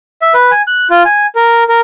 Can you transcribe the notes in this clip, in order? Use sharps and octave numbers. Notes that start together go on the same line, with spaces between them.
E5
B4
G#5
F#6
F4
G#5
A#4
A#4